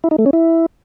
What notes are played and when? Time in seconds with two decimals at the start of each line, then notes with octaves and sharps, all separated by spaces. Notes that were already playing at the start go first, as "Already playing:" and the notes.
0.04 E4
0.11 D#4
0.18 A3
0.26 C#4
0.33 E4